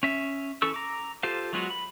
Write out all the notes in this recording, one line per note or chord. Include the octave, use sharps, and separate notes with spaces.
C#4 E5
E3 C#4 A4 C#6 E6
A#5 D6
F4 G4 A4 C5 F5
F#3 G#3 B3 F4 F#4
B5